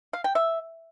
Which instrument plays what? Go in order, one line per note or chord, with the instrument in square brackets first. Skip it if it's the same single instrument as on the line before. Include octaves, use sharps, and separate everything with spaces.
[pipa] F5
G5
E5